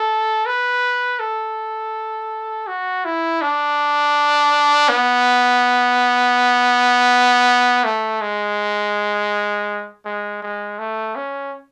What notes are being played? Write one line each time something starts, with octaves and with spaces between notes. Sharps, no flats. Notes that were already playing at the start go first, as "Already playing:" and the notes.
Already playing: A4
B4
A4
F#4
E4
D4
B3
A3
G#3
G#3
G#3
A3
C#4